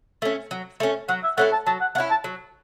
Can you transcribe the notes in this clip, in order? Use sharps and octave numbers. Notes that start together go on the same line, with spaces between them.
A3 C#4
F#3
A3 C#4
F#3 F#5
E5
A3 C#4 E4 F#5
A5
F#3 A5
F#5
A3 F#5
C#4 E4
A5
F#3